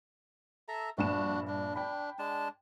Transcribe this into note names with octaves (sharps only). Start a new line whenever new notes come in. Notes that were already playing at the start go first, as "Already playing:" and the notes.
A4 E5 A#5
A#1 G2 D4 F#4 E7
D4
D4 G5 B5
G#3 D4 A5